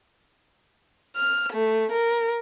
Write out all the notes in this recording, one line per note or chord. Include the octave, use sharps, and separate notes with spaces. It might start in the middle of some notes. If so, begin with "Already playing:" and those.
F6
A3
A#4